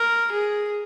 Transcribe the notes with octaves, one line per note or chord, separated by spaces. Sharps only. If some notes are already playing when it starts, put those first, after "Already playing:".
Already playing: A#4
G#4